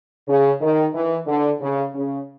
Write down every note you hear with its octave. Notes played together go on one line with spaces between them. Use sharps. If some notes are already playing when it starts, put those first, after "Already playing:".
C#3
D#3
E3
D3
C#3
C#3